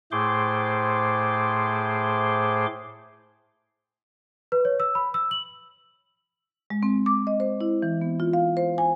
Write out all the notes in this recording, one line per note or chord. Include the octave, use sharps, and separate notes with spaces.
A2 A3 G#4 C5 C6 D6
B4
C#5
E6
B5
E6
F#7
G#3
C4
D6
D#5
C5
E4
E3
B3
F4
F5
C5
G#5